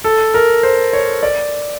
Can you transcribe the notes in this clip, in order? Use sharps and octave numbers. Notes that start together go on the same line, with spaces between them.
A4
A#4
C5
C#5
D5